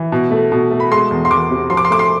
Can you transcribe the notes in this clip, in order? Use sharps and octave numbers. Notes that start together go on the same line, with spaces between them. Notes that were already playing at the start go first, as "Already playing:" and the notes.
Already playing: E3
B2
A3
B2
A3
B5
G#3 C6
E2
C6
E2 D6
C3
F3 C6
D6
C6
A3 D6
C6